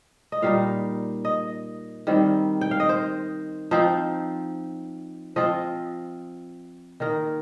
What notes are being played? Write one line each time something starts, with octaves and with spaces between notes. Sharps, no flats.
D#5
A#2 G3 D#4 F5
D#5
D#3 G3 C4
G5
F5
D#5
C5
F3 C4 D#4 C5
F3 C4 F4 D#5
D#3 A#3 D#4 A#4